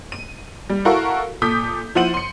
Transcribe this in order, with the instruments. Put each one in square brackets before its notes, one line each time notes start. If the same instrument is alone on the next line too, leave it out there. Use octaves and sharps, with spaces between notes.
[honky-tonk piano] D#7
G3
E4 F#4 A4 A#4 F5 C#6
A#2 A4 D6 D#6 G6 B6
F3 E4 C5 F#5 D#7 F#7
C6 C#7